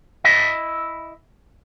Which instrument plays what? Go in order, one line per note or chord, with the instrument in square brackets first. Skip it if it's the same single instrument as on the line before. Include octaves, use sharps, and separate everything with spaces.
[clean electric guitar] E4 D#5 E5